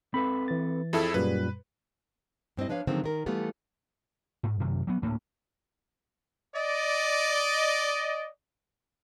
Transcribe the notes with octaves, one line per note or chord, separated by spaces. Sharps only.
C4 A4 B4 B5
E3 A6
F2 E4 G#4 A4
F#2 A#2 G3 B4
G2 C4 E4 D#5
F3 D4 B4 C#5 F5
D3 D#3 F3 F#3 G#3 C4
D#3 A#4
E3 G3 A3 B3 F4 A4
G#2
F#2 C3 D#3
F#3 B3
D2 A2 A#3
D5 D#5